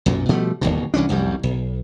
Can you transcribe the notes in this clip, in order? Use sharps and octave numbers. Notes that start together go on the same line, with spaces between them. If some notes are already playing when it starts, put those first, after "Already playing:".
B1 F#2 A#2
B2 F3 G3 A3
D1 G#1 D#2 B2
C2 E3 C#4 D4
F1 C2 F#2 G3
B1